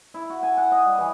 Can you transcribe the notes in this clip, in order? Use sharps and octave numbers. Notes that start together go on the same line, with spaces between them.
E4
F#4
G#5
F#5
D#5
G3
E3